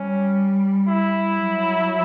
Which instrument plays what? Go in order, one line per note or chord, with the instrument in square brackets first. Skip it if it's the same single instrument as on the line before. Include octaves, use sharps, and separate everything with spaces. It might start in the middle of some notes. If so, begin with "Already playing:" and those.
Already playing: [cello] G3 [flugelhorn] C#4
[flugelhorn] E4
[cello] F#3